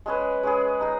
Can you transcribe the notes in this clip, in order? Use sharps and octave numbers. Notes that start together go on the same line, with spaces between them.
G#3 C#4 G#4 B4
G#3 C#4 G#4 B4
D#4 G#4 D#5